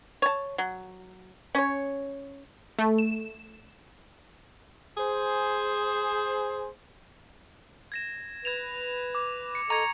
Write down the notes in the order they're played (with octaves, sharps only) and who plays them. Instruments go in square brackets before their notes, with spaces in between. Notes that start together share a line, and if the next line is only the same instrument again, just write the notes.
[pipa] C#5 A5
F#3
C#4 C#5
[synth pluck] A3
E7
[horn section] G#4 C5
[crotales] G#6 A#6 E7
[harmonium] B4 [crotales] G#6 E7 F7
[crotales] D6
C#7
[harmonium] A4 D#5 [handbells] A#5 [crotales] C#6 G#6 C#7